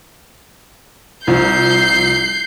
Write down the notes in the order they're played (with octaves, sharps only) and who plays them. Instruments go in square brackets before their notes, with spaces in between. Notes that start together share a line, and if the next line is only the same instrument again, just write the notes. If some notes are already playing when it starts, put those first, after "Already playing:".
[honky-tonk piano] C2 F3 [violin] G6 C7